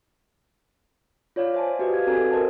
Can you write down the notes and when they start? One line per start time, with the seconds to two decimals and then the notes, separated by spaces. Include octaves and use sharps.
1.36 F4 C#5 D5 F5
1.54 C5 E5 G#5 A5
1.79 F#4 G4 B4 D5 D#5
1.93 F5 G#6
2.07 C4 F#4 A4 B4 G#5 A#5
2.32 A4 A#4 C5 D#5 A5